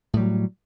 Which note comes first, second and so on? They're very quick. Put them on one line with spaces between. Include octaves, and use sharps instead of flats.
A2 G3 F#3